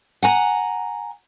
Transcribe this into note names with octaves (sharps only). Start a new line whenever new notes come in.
F#5 G#5 A#5